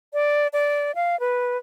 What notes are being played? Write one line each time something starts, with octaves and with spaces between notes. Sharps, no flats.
D5
D5
F5
B4